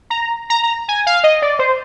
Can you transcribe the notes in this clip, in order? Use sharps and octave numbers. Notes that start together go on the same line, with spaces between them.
A#5
A#5
A#5
G#5
F5
D#5
D5
C5